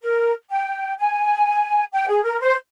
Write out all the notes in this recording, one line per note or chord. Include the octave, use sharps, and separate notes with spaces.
A#4
G5
G#5
G5
G#4
A#4
C5